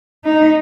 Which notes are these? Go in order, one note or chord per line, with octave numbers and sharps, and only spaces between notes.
D#4